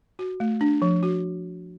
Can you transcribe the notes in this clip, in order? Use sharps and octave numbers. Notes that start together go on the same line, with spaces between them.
F#4
A3
D4
F3
F#4